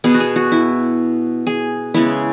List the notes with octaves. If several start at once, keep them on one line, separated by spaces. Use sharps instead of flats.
B2 B3 G#4
F#4
G#4
F#4
E4
G#4
C#3 G#3 B3 E4